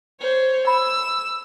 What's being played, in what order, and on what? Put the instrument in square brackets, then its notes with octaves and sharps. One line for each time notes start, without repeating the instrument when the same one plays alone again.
[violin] C5 C#5
[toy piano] B5 [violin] E6